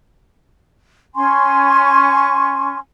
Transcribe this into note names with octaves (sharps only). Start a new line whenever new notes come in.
C#4 G#5 C6 C#6